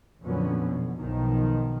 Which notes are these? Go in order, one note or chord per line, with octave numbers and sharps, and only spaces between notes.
F2 A#2 D3 F#3 B3 C#4
B2
B1 B2 D#3 F3